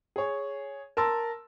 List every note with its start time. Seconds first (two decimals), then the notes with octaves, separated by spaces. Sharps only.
0.16 G#4 C#5
0.97 A#4 A5 C6 E6